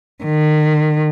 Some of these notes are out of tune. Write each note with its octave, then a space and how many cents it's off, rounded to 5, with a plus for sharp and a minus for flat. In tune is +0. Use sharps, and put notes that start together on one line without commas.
D#3 -35